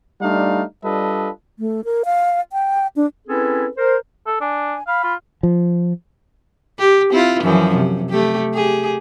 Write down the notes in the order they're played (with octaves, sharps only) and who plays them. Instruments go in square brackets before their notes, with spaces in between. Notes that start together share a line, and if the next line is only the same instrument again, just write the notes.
[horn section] G3 A3 D4 D#4 F4 F5
G3 D4 F4 A4 B4 D#5
[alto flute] A3
A#4
F5
G5
D4
[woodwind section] C4 C#4 E4 G#4 A4 B4
A#4 C5
[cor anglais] A4
[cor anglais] D4 [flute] G#5
[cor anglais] F5 [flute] B5
[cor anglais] F4
[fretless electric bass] F3
[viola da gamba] G4
C4 E4 F4
F#2 E3 F3
C3
A3 G4
G4 G#4